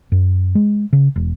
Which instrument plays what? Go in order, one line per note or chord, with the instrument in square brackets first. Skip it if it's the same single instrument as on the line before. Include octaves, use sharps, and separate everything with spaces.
[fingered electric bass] F#2
G#3
C#3
E1